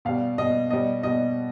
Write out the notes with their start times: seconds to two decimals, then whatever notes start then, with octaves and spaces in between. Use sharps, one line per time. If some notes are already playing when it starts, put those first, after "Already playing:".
0.05 B2 G3 F5
0.38 B2 G3 D#5
0.70 B2 G3 D#5
1.03 B2 G3 D#5